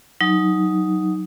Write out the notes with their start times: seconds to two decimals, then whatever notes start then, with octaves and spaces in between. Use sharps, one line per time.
0.21 F#3 D#4